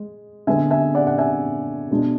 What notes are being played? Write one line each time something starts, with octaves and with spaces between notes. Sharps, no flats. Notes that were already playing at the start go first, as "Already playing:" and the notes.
Already playing: G#3
D3 G#3 B3 E5 G#5
E5 G#5
D5 F#5
F#5
E5 G#5
B2 G#3 D4